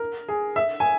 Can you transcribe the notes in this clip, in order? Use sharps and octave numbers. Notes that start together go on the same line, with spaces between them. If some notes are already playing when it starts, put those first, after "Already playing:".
Already playing: A#4
G#4
E5
G#5